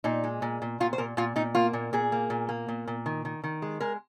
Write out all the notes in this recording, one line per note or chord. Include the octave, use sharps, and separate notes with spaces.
A#2 D#4
G#3
A#2
A#2
A#2 F4
C5
A#2 A#4
A#2 F4
A#2 D#4
A#3 F4
A#2
A#2 G#4
A#3
A#2
A#3
A#2
A#2
D#3
D#3
D#3
G#3
G#3 A#4